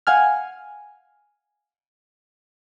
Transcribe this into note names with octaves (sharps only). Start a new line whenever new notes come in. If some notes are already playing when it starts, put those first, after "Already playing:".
F5 F#5 G#5 F6